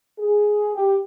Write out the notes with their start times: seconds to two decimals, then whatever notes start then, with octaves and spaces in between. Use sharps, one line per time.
0.18 G#4
0.74 G4